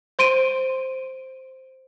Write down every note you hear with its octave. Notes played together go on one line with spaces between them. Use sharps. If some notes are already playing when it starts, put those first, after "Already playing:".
C5 C6 D7 D#7